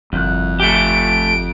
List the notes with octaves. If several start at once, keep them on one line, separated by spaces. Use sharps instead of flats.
G1 C2 F2 F#6
A3 G4 D7